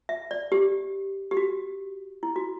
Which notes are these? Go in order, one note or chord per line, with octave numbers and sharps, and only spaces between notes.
E5
D5
G4
G4
F#4
E4
F#4